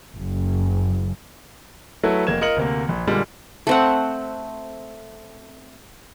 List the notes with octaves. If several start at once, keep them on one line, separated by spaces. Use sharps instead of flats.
F#1 F#2
F#3 A3 E4 A4 B4
F1 A#3 G#6 E7
F4 A#4 D#5 C#7 F#7
D2 C3 A#3
A#1
A#2 D3 G3 G#3
A3 C4 F#5